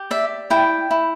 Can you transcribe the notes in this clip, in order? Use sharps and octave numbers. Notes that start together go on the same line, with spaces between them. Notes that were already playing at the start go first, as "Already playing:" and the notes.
Already playing: G4
D5 E5
E4 G5
E4